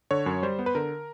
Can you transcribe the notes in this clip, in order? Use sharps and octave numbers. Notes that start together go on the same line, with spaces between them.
D3 C#5
F#2
G3 C5
B3
B4
D3 A#4